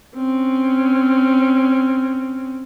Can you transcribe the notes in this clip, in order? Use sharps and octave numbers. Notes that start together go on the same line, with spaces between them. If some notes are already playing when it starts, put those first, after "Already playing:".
C4 C#4